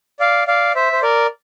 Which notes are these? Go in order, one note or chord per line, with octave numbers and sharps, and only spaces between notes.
D5 F5
D5 F5
C5 E5
C5
A#4 D5